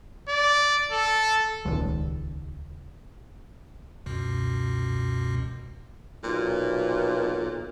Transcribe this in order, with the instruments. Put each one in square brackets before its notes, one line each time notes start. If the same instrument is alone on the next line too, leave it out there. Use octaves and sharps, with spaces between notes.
[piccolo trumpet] D5
A4
[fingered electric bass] D#1 C#2
[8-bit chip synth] C#2 F#2 B2
[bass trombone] B1 [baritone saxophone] A#2